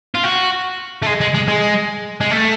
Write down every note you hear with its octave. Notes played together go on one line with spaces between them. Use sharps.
F4
F#4
A3
G#3
G#3
G#3
G#3
G#3
A3